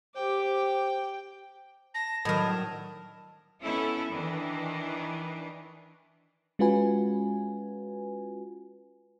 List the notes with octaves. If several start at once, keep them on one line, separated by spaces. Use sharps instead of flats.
G4 C5 G5 D6
A5 A#6
A2 D#3 F#3 D4 A#4 D#5
B3 C#4 E4 A4
D#3 E3 D4
G#3 C#4 F4 F#4 B4 G#5